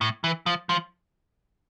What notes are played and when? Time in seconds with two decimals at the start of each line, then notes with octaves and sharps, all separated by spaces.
0.01 A2
0.24 E3
0.46 F3
0.69 F3